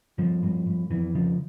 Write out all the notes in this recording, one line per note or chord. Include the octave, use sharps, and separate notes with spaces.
G2 F3
G2
G2
F2 E3
C#3 F3